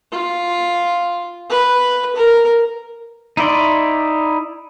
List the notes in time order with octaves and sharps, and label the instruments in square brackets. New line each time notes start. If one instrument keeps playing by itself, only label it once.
[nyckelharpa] F4
B4
A#4
[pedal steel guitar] D#4 E4 D5 C6